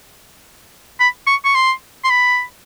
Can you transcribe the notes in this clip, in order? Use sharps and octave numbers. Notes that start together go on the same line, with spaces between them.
B5
C#6
C#6
C6
C6
B5